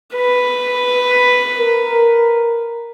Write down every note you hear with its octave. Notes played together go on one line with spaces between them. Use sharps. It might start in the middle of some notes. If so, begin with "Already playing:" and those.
B4
A#4